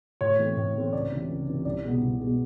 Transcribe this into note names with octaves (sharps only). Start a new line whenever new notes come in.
A2 C#5
E3 A3 C4
A2
E3 A3 C4
C#2 D5
C3 E3
C#2
C3 E3
C2 D5
B2 G#3 B3
C2
B2 G#3 B3